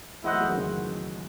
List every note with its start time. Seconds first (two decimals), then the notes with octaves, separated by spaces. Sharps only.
0.23 E3 G#3 E4 C5 D#5 F#5
0.32 F#3 A3
0.40 E3 G#3
0.48 D#3 F#3
0.56 C#3 E3